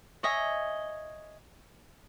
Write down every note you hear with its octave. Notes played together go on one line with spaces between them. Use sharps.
C#5 D#5 E5 G#5